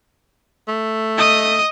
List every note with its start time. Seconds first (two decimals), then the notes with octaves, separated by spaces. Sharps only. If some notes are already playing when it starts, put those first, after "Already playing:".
0.68 A3
1.18 D#5 D#6